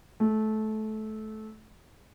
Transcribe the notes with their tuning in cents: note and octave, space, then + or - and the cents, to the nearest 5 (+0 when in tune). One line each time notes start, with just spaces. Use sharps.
A3 -20